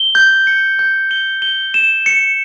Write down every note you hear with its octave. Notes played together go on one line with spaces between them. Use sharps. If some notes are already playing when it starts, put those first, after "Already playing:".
Already playing: G7
G6
C#7
G6
G7
G7
E7
C#7